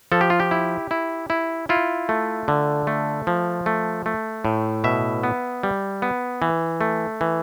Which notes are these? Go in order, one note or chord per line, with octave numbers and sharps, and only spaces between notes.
F3 A4
G4
F4
G4
E4
E4
E4
E4 F4
A3
D3
A3
F3
A3
A3
A2
B2 E5
B3
G3
B3
E3
A3
E3